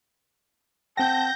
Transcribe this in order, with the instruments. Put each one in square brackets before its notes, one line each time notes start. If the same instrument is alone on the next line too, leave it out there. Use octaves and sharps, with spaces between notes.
[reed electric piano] C4 F#5 G5 [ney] A5 [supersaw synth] G6 A#6